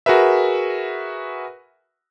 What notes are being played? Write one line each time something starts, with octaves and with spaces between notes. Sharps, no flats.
F#4 G#4 A#4 B4 E5